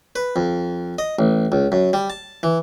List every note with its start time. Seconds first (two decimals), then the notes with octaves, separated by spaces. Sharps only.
0.16 B4
0.36 F2
0.99 D#5
1.19 A1
1.52 C#2
1.72 F#2
1.93 G3
2.10 A5
2.43 E3